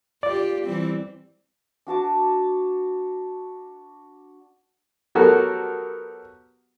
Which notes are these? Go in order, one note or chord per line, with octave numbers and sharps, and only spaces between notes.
F4 G4 D5
E3 G3 C4
D4 F#4 A5 D6
F#3 B3 F#4 G4 A4 A#4